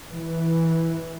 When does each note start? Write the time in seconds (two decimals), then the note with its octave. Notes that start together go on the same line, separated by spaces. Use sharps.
0.13 E3